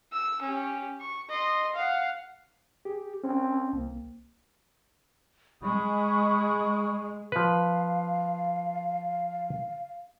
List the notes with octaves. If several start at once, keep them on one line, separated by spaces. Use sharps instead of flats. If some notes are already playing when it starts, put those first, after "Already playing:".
E6
C#4 G4
C#6
D#5 C6
F5 F#5
G4 G#4
C4 C#4
C2 A#3
G#3 B5 C#6 D#6
F3 B4 F5